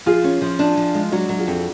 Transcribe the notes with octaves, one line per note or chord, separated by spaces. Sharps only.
F3 F4 G#4
C#4
F3
D4
F3
G#3
F#3 D4 F#4
F#3
F4 G#4
F2